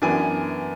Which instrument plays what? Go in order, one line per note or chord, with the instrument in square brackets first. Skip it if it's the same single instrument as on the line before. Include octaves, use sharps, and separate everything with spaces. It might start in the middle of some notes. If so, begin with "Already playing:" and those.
[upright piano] F#2 E3 B3 D4 G#5